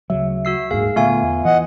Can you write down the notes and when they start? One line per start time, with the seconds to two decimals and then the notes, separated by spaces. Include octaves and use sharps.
0.10 D2 C#3 F#3 E5
0.45 F#4 E6 C7
0.71 D#1 G#2 A#3 G#4 F5
0.96 A#2 D3 A3 B3 F4 E5 F5 G#5
1.23 E2
1.45 E3 D#5 F#5